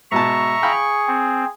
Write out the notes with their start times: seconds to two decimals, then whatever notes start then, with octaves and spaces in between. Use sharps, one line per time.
0.12 G#2 B2 E5 A5 A#5 C#6
0.63 G#4 F5 G5 B5
1.08 C4